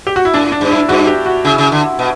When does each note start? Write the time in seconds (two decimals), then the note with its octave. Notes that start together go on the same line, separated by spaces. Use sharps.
0.07 G4
0.16 F#4
0.25 E4
0.34 A2 D4
0.52 D4
0.61 G2
0.71 E4
0.89 G2 F#4
1.07 G4
1.26 F#4
1.45 C#3 E4
1.58 C#3
1.72 D3
1.99 B2